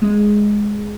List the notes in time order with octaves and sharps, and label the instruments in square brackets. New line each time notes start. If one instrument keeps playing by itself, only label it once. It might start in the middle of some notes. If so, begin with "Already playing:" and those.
[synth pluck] G#3